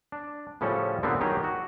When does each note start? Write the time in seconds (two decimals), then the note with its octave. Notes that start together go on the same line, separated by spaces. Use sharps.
0.12 D4
0.61 A2 C#3 F3 G3 C#4 A4
1.03 A#2 D3 G3 B3 C4
1.21 D#3 F#3 D#4 G4 G#4
1.44 F#4